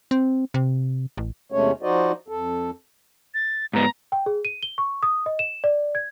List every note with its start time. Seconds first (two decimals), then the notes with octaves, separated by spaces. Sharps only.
0.11 C4
0.54 C3
1.17 A1
1.52 E2 C3 G#3 A3 C#4 C#5
1.82 F3 D#4 F#4 C5 D5 D#5
2.28 F2 A4
3.34 A6
3.73 G#2 B3 A#5
4.12 G5
4.26 G#4
4.45 D#7
4.63 G7
4.78 C#6
5.03 D#6
5.26 D#5
5.39 E7
5.64 D5
5.95 G#6